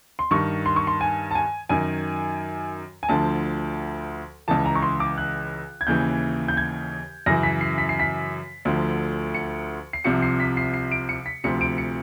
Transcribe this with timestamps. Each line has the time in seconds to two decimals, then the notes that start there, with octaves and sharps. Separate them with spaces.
0.19 C6
0.31 G2 D#3 C#6
0.66 C6
0.76 C#6
0.87 C6
1.01 G#5
1.31 A5
1.35 G#5
1.69 F#2 D#3 G#5
3.03 G#5
3.09 D2 D3 F3 A5
4.48 C#2 C#3 E3 A5
4.66 A#5
4.75 C#6
4.82 C6
5.00 D6
5.18 F#6
5.81 G#6
5.87 D#2 C#3 E3 G6
6.48 G6
6.57 G#6
7.26 F#2 C#3 E3 A#6
7.43 B6
7.61 C7
7.78 B6
7.89 C7
8.00 B6
8.65 D2 D3 F3
9.35 C#7
9.93 C7
10.04 C2 C3 F3 C#7
10.22 C7
10.40 B6
10.57 C7
10.74 C7
10.92 D7
11.09 C#7
11.26 B6
11.44 D2 C3 F3 C#7
11.61 D7
11.78 C#7